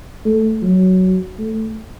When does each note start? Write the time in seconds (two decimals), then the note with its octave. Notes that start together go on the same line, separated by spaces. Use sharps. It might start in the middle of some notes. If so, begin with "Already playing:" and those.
0.25 A3
0.63 F#3
1.38 A3